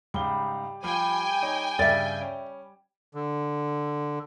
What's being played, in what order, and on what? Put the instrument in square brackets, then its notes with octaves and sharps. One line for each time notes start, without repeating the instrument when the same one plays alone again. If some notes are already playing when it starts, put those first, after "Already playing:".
[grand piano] G#2 C#3 G7 [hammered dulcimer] G3
[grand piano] F3 [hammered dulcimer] G3 [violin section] G5 G#5
[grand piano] D#4 C#5
[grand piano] G2 C#3 [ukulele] D5 E5
[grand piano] C#4
[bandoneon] D3